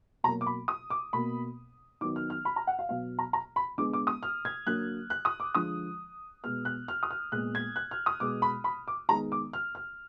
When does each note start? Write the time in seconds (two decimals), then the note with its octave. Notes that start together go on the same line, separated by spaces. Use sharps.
0.24 B2 A#5
0.27 F#3 A#3
0.41 D6
0.46 B5
0.68 D#6
0.90 D6
1.13 B2 A#3 B5
2.01 D#3 F#3 B3 D6
2.16 F6
2.30 F6
2.45 B5
2.56 A#5
2.67 F#5
2.79 F5
2.89 B2 F#3 B3 F5
3.19 A#5
3.33 A#5
3.56 B5
3.78 D3 G#3 B3 D6
3.93 D6
4.07 D#6
4.23 F6
4.45 G#6
4.66 D3 F#3 A#3 F#6
5.10 F#6
5.25 D#6
5.40 D6
5.55 D3 F3 G#3 D#6
6.44 B2 G#3 B3 F6
6.65 F#6
6.88 F6
7.03 D#6
7.11 F6
7.32 A#2 G#3 B3 F#6
7.55 G#6
7.76 F#6
7.91 F6
8.06 D#6
8.20 B2 G#3 B3 D6
8.42 B5
8.64 B5
8.88 D6
9.09 D#3 G#3 B3 A#5
9.32 D6
9.53 F6
9.75 F6